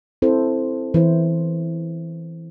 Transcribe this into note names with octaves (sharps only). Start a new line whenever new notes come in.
C4 E4 A4 C5
E3 E4 C5